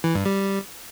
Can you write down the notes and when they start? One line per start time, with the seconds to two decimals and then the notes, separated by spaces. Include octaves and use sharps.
0.04 E3
0.15 G2
0.25 G3